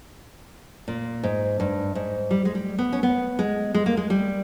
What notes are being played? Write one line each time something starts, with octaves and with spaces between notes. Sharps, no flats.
A#2
G#2
G2
G#2
G3
G#3
G3
B3
C#4
B3
G#3
G#3
A#3
G#3
G3